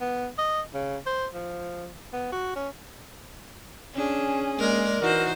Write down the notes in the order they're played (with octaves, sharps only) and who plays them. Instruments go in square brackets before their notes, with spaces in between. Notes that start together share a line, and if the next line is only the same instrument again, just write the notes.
[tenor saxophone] B3
D#5
C#3
C5
F3
B3
F#4
C#4
[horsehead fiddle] C#4 G#4 [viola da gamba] D4
[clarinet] G#3 [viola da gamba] A#3 A#4 D5
[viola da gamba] E3 C5 [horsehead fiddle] D#4 F#4 [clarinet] A#4